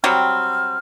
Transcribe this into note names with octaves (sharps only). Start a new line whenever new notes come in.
F#3 G3 C4 F6